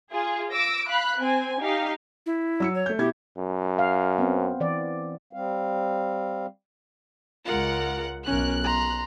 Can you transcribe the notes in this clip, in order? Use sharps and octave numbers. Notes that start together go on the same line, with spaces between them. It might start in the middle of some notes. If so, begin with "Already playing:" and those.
F4 G#4
D6 E6 A#6 D7
F5 B5 F#6
C4 G#5
D#4 G4 F5
E4
F#3 E6 C#7
C#5
A3 G6
B2 E4 G4 G#6
F#2
F5
B3 C4
E3 D5
G3 C4 F5
C#2 G#3 F4 A#4 F#5
B1 C#4 A#4 F#6
A#5 C6